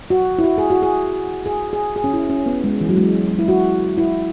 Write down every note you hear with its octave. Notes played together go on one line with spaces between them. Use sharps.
F#4
E4
F#4
G#4
F#4
G#4
G#4
G#4
G#4
C#4
E4
C#4
B3
G#3
E3
F#3
G#3
E4
F#4
E4